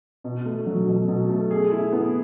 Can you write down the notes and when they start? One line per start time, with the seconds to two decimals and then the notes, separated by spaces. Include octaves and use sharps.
0.24 B2
0.46 A3
0.67 F#3
0.88 B2
1.08 B2
1.29 A3
1.51 G#4
1.71 E4
1.92 B3